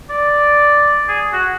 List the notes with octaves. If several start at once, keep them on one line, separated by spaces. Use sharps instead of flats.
D5
G#4
F#4